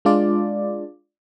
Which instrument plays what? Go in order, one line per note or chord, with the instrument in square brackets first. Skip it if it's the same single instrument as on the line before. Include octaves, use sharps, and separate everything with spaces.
[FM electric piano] G#3 D4 F4 D5